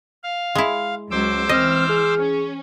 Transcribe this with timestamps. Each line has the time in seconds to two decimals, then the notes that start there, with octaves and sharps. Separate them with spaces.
0.23 F5
0.55 G#3 E4
1.11 C#2 F#3 C5 D6 E6
1.49 E3 C4 D#5 F6
1.89 G#4
2.18 C#4